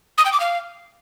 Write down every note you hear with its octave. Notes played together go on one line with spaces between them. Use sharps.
D#6
G5
D6
F5